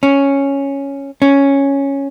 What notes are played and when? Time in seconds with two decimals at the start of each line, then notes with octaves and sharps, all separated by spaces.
0.03 C#4
1.22 C#4